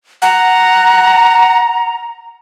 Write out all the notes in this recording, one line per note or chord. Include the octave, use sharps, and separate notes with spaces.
F#5 A#5